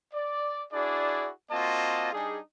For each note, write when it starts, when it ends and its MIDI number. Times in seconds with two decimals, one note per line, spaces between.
0.14 0.63 74
0.72 1.29 62
0.72 1.29 64
0.72 1.29 66
0.72 1.29 68
0.72 1.29 74
1.51 2.10 58
1.51 2.10 60
1.51 2.10 65
1.51 2.10 66
1.51 2.10 75
1.51 2.10 81
2.12 2.38 55
2.12 2.38 62
2.12 2.38 63
2.12 2.38 68